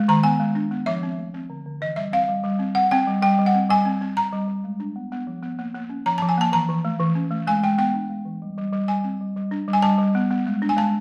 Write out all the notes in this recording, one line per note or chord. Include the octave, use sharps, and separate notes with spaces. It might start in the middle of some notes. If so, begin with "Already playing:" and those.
Already playing: G#3
D#3 A#5
B3 G#5
G#3
D4
B3
F3 E5
C4
A3
C4
D3
D3
E3 D#5
G3 E5
C4 F5
G3
G3
C4
C4 F#5
C4 G5
G3
G3 G5
G3
F#5
C4
G3 G#5
C4
C4
C4 A#5
G3
G3
G#3
D4
B3
B3
F3
B3
A#3
A#3
C#4
F3 A#5
A5
F3
G#5
A#3 A5
E3 A#5
E3
A3
E3
C#4
A3
G#3 G#5
G#3 G5
B3 G5
D4
G#3
E3
G3
G3
G3
G3 G#5
C4
G3
G3
D4
G3
G#5
G3 A5
G3
B3
B3
G#3
D4
G#5
G#3 A5